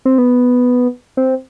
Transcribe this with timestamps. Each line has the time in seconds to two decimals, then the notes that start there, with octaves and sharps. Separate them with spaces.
0.05 C4
0.18 B3
1.17 C4